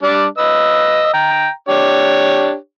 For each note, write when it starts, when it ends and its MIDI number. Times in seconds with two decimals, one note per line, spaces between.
0.03 0.25 55
0.03 0.25 62
0.38 1.11 71
0.38 1.11 75
0.38 1.11 88
1.14 1.50 79
1.14 1.50 82
1.69 2.55 62
1.69 2.55 67
1.69 2.55 73